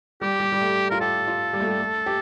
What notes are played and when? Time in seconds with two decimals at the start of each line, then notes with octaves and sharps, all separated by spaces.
0.21 G3 G4
0.40 G3
0.52 G3
0.61 A3
0.90 F4 A#4
1.01 G4 A4
1.27 F4
1.53 G3
1.60 A3
1.68 G3
1.80 A3
2.06 G4